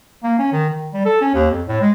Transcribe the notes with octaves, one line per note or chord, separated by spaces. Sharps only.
A#3
C#4
D#3
D#3
G3
A4
C#4
D#2
F2
A2
G#3